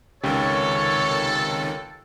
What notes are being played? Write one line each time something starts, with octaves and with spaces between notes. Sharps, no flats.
C#2 C3 D#3 C#4 G4 A4 C#5